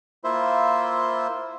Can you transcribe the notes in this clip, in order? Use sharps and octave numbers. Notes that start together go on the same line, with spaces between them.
A#3 E4 F4 C5 E5